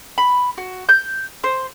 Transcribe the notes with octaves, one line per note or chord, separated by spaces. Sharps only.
B5
F#4
G6
C5